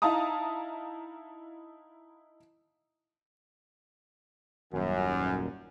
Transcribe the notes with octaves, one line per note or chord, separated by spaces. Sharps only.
D#4 E4 F5 A5 A#5 D#6
D#1 F#2